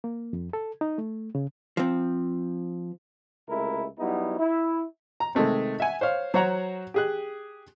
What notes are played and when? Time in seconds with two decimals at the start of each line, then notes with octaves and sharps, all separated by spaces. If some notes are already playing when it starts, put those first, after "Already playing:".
0.04 A#3
0.33 F2
0.53 A4
0.81 D#4
0.98 A3
1.35 C#3
1.77 F3 C4
3.49 C#2 C3 A3 E4 A#4
3.99 F#3 G3 B3 D#4 E4
4.39 E4
5.20 A#5
5.35 C3 D#3 G#3 A3 C4
5.80 E5 F#5 G#5
6.01 C5 C#5 F5
6.34 F#3 C5 C#5 F#5 A#5
6.94 G4 G#4 F#6